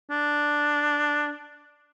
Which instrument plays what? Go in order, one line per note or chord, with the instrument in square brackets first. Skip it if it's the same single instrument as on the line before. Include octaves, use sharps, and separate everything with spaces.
[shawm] D4